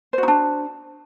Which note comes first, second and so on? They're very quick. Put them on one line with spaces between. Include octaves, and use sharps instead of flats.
C5 F#4 D#4 D4